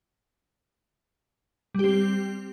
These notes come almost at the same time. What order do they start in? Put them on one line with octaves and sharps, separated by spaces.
G3 G4 C4